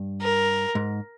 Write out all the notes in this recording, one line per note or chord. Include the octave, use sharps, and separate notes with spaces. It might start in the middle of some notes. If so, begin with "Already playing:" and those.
Already playing: G2
A#4
G#2